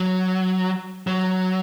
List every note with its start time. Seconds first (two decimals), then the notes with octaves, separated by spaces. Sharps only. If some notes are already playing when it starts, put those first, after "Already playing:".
Already playing: F#3
1.07 F#3